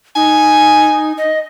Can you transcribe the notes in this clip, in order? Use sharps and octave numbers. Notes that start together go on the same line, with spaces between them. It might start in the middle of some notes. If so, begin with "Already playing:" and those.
D#4 G#5
D#5